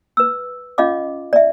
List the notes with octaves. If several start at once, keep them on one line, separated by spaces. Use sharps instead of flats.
B4 E6
C#4 F4 D#5 F5 D6
D5 E5